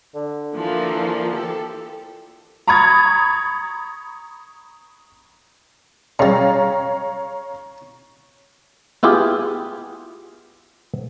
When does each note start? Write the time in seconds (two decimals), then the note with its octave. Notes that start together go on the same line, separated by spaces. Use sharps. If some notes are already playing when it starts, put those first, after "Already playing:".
0.15 D3
0.53 E3 F3 A#3
1.32 G4 A4
2.67 A#5 B5 C#6 D#6 G#6 A6
6.19 C#3 G3 C#5 F5 A#5
9.03 B3 E4 F4 G4 G#4